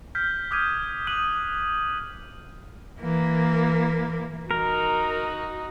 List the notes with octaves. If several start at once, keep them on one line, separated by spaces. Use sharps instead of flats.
F6 G6 B6
D6 D#6 F6 G6 G#6 D#7
D#6 F#6 G6 D#7 F#7
E3 A#3
D#4 F#4 A#4